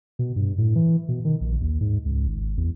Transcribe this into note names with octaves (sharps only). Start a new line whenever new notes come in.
B2
G2
A2
E3
B2
D#3
A#1
D#2
G#2
C#2
G#1
E2